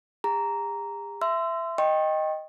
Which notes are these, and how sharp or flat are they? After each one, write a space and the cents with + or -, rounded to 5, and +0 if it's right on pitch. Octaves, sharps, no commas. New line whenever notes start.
G#4 -45 A#5 +0
E5 +10 C6 -20 E6 +20
D#5 +0 G5 +0 C#6 -40